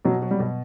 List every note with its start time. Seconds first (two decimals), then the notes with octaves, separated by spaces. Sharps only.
0.05 B2 F#3
0.22 F#3
0.31 G3
0.39 B2